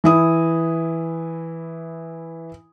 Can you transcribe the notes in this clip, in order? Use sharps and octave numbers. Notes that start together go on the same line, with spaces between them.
E3 E4 D#6